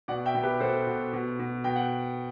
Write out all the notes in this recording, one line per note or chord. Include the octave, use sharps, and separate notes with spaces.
B2 D5 F#5
E5 G5
B2
G4 B4
B2 A4 C5
B2
B2
B2
B2 G5
F#5